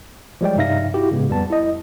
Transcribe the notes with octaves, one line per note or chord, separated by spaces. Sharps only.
F3 G3 G#3 C#5 D5 G5
G2 C3 D#4 E5 F5 A#6
E4 F#4 G4
A2 C#3 G#3 B3
F2 G3 B3 A5
E4 D#5